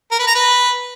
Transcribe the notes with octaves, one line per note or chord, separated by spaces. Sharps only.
A#4
B4
A#5
B4